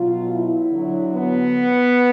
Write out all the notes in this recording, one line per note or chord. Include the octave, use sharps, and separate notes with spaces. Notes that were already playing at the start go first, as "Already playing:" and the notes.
Already playing: B2 F#3 F4
E4
D3 F#3
B3